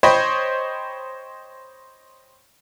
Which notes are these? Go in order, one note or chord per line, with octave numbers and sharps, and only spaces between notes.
C5 C#5 D#5 G5 B5